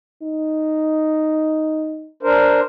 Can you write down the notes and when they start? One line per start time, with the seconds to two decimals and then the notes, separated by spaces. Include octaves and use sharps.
0.23 D#4
2.23 D4 A#4 C5